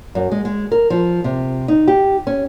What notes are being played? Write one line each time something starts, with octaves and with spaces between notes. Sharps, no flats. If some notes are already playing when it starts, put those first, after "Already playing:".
F#2
G#3
G#3
A#4
F3
C3
D#4
G4
C#4